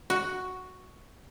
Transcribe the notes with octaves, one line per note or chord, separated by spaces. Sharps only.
F#4